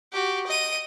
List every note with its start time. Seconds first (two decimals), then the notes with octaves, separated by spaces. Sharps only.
0.13 F#4 G4
0.47 D#5 D#7